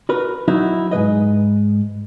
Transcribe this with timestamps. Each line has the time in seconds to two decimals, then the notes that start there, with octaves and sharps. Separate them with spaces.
0.09 F#4 A#4 B4
0.48 F#3 D#4 E4 F#4
0.91 G#2 B2 B4 D#5